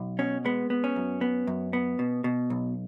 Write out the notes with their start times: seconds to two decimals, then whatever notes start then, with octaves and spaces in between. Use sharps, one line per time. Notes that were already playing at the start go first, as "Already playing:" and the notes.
Already playing: B1
0.19 B2 C#4
0.45 G#3 B3
0.70 B3
0.84 C#4
0.96 F#2
1.21 B3
1.47 F#2
1.73 B3
1.99 B2
2.24 B2
2.50 B1